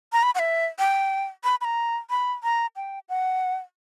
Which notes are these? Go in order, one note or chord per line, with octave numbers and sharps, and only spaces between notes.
A#5
B5
F#5
E5
G5
B5
B5
A#5
B5
A#5
G5
F#5